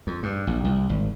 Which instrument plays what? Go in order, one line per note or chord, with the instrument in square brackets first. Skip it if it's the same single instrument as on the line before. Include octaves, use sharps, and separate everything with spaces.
[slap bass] F2
G2
A#1
C2
G#1